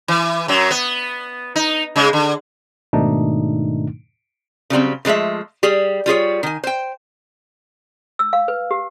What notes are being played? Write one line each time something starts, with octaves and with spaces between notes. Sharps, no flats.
E3
F#2 F#3
B3
D#4
C#3 G#3
D3
G#2 B2 D#3 A3 D4 D#4
C#3 F#3 G3 C4
C#3 F3 G#3 A3 E5
G3 G4 G#4
G3 F4 G#4 C#5
D#3 G#5
C5 G5
E6
F5
B4
G4